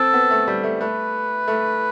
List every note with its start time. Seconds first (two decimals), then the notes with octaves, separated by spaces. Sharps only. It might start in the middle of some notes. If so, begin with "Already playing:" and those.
Already playing: C4 A4
0.14 B3
0.31 A3
0.48 G3
0.64 A3
0.81 A3 B4
1.48 A3